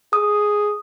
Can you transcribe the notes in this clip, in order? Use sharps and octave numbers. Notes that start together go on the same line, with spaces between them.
G#4 D#6